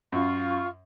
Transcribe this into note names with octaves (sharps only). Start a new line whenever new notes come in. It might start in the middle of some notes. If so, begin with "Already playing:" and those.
F#2 F4 C#6